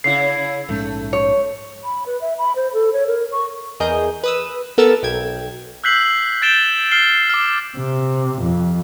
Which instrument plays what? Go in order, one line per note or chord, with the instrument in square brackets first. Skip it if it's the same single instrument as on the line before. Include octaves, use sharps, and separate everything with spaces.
[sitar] C#3 E4 [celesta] C7
[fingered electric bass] A#1 G#2 C#4 [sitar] A3
[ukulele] C#5
[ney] B5
B4
E5
B5
C5
A4
C#5
A#4
C#6
[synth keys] E2 G#4 A#4 D#5 D#6 G6
B4 D#6 E6
B3 A4 A#4 E6 A6
B1 G5 G#6
[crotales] E6 F#6 G6 B6 C7 F#7
G6 A6 D7 E7 G7
F6 C7 G7
D6 F6
[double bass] C3
F2